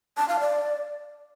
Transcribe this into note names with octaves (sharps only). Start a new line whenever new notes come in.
A5
F5
D5